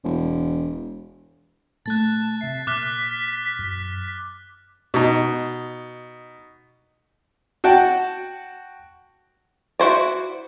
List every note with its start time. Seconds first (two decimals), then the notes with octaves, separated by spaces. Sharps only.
0.04 E1
1.86 A#2 A3 A5 F#6 A6
2.41 C3 E5 C7
2.67 A#2 D6 F6 F#6 B6
3.59 F#2
4.94 B2 D#4
7.64 F#4 F#5 G5 A5
9.80 E4 F#4 C5 D5